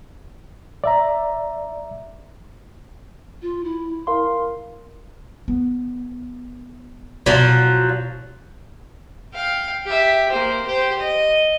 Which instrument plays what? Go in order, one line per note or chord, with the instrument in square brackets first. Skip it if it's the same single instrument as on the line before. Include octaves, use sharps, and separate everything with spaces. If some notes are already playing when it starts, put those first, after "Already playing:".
[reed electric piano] D5 E5 A#5
[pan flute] F4
E4
[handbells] A#4 F5 C6
[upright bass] B3
[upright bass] B2 E4 [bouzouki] F3 F#3
[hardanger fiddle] F5 G5
G4 E5
A#3 C5
G4 C5
D#5